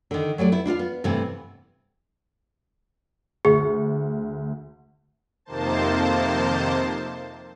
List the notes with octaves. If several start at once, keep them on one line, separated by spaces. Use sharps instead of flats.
D3 D#3
F#3 G3 A3 D5
B3 E4
D4 E4 F4 F5
B3
G2 C3 E3 A3 B3 C4
D2 G#4
F2 C3 D#3 A#3 C5 A5